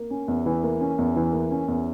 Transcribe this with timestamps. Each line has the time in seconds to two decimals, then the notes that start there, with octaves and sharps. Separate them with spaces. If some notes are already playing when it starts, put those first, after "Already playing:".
Already playing: A#3
0.10 C#4
0.28 E2
0.46 E3
0.63 A#3
0.81 C#4
0.98 E2
1.16 E3
1.33 A#3
1.51 C#4
1.68 E2